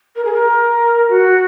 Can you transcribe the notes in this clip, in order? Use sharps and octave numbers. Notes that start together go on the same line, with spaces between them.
A#4
G#4
A#4
F#4